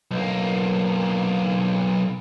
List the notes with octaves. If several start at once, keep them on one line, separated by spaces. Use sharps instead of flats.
B1 A#3